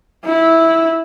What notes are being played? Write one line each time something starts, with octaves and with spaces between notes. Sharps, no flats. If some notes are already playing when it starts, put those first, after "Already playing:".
E4